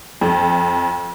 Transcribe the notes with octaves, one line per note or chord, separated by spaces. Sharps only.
F2